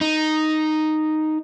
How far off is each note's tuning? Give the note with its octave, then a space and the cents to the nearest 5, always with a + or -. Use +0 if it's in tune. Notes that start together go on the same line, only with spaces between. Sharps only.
D#4 -5